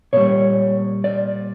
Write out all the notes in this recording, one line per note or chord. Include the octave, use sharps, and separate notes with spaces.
A#2 G3 C#5
D5